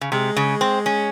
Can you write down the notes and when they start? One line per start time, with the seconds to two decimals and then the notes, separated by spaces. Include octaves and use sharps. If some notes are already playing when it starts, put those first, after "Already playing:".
0.01 C#3
0.12 C3 G#3
0.37 C#3
0.61 C4
0.86 C#4